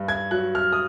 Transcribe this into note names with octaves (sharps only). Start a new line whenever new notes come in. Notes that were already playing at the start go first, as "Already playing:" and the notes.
Already playing: G2
G#6
F#3 F#6
F6
D#6